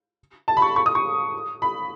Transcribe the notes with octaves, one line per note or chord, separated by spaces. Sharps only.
A5
B5
C#6
C#6
D#6
C#6
B5